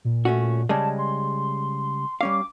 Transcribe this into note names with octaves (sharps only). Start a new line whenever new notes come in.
A#2
A3 C#4 F#4
C#3 G3 G#3 A5
C6
G3 C#4 F5 D6